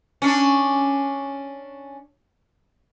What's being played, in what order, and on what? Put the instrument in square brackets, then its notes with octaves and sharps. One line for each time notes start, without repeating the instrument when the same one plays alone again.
[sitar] C#4 D4